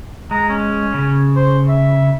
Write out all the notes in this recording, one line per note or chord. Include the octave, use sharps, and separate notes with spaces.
G#3 A#5
C#4
C#3
C5
E5